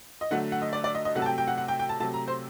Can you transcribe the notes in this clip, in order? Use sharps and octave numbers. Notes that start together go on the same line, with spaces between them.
D#5
D3 F#3 A3 F#5
F#5
D#5
D5
D5
D#5
D#5
C3 F#3 A3 F#5
A5
G5
G5
F#5
F#5
G5
G5
A5
C3 F#3 A3 A5
A#5
C5